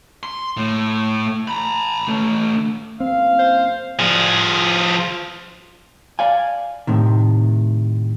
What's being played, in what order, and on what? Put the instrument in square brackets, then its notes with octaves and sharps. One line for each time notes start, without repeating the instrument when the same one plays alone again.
[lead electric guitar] C6
A2
A#5 B5
A3 C#4
[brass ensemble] F#1 F5 [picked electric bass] C4
[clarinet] C5
[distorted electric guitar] F3 G#4
[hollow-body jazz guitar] D5 F5 G#5
A2 C3 D#3